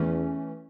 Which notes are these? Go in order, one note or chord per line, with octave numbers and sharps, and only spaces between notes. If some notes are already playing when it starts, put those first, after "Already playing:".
Already playing: E2 E3 A3 C#4